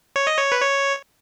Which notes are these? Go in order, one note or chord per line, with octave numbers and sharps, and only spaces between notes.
C#5
D#5
C#5
B4
C#5